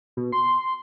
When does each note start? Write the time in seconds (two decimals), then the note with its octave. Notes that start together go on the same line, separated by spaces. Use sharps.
0.17 B2
0.32 C6